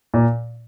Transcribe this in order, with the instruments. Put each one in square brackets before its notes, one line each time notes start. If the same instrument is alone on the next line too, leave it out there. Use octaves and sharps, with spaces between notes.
[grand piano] A#2